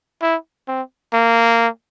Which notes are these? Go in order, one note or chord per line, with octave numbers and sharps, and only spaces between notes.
E4
C4
A#3